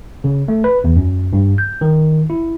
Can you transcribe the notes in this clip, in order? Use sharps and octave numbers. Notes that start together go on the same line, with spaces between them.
C#3
A3
B4
E2
F#2
G2
G6
D#3
E4